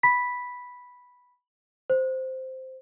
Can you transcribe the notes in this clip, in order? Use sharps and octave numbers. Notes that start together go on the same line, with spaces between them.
B5 B6
C5